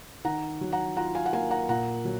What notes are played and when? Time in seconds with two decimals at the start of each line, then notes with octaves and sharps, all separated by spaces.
0.25 D#3 F#5 A#5
0.61 F#3
0.73 F#5 A#5
0.97 F4 F#5 A#5
1.14 F5 G#5
1.26 F#5
1.33 A#3 F5 G#5
1.51 F#5 A#5
1.69 A#2 F#5 A#5
2.05 F#3